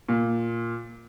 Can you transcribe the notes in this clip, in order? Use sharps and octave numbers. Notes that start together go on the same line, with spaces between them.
A#2